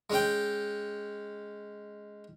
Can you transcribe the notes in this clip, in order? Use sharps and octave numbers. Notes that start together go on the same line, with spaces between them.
G#3 C#4 G5